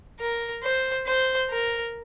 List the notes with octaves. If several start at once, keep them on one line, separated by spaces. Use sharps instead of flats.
A#4
C5
C5
A#4